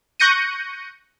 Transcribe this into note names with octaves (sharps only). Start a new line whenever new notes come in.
C#6 F#6 G6 A#6 C#7 D#7